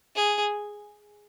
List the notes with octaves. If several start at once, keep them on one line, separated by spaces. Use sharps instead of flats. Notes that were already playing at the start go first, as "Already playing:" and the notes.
G#4